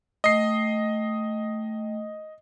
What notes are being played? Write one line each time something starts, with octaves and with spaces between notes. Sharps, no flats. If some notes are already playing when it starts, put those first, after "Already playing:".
A3 D#5 G5 C7